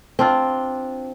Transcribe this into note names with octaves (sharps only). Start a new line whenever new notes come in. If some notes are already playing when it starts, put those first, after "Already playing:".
C4 D4 F4